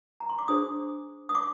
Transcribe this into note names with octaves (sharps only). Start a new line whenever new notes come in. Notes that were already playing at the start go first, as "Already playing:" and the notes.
A#5
C6
D6
D4 G#4 C5 D#6
D#6
D6